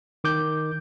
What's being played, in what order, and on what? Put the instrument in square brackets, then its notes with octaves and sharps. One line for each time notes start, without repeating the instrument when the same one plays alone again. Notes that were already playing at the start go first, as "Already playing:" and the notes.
[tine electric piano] D#3 D6 G6